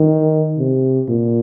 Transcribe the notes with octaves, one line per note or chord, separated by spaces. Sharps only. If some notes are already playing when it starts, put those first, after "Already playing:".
Already playing: D#3
C3
A#2